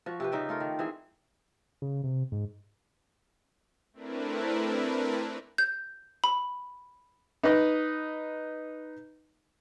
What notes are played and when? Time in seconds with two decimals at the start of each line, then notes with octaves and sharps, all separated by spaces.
0.06 F3 F#4
0.20 C3 G4 B4
0.32 C#3 D#4 E5 G5
0.49 A3 F4 A#4
0.60 D#3
0.79 E3 C4 G#4
1.82 C#3
2.04 C3
2.32 G#2
3.93 A3 C4 D4 E4 A#4 B4
5.58 G6
6.24 B5
7.43 D#4 B4 D#5